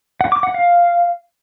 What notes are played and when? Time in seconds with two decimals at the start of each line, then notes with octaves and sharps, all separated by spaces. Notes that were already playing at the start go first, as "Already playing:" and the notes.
0.21 F#5
0.32 D6
0.43 F#5
0.54 F5